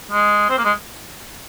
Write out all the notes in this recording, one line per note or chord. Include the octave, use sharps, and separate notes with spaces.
G#3
C4
A#3
G#3